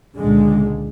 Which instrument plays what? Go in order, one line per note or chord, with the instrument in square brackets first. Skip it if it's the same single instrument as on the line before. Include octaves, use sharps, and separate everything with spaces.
[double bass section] C#2 A#2 D3 G#3